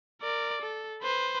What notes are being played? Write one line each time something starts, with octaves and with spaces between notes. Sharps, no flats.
A#4 D5
A4
B4 C5